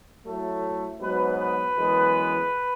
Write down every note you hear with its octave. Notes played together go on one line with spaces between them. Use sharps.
A2 F#3 A3
G#2 F#3 B3 B4
B4
F#2 E3 G#3 B3